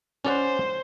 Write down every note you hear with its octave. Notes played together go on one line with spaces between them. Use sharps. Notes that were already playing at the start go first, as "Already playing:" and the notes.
C#4 C5 D5 F#5